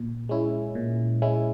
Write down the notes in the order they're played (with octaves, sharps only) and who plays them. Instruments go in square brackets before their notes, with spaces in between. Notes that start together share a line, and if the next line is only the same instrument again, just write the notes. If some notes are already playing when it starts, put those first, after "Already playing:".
Already playing: [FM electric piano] A#2
G#3 C#4 E4
A#2
G#3 C#4 E4